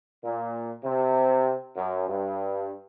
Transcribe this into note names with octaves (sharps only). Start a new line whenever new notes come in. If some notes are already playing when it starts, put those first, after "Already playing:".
A#2
C3
F#2
G2